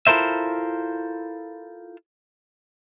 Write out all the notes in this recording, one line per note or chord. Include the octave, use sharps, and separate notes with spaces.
E4 F4 A4 A#4 C5 E5